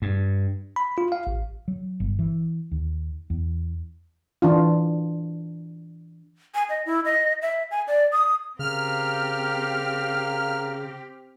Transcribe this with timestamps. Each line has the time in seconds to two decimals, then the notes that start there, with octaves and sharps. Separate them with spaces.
0.02 G2
0.76 B5
0.98 F4
1.12 F5
1.27 A1
1.68 F#3
2.00 G1
2.19 E3
2.71 D#2
3.30 E2
4.42 E3 D4 F4
6.55 G#5
6.69 D#5
6.86 E4
7.05 D#5
7.42 E5
7.71 G#5
7.88 D5
8.12 D#6
8.59 C#3 C4 G4 A#4 F5 F6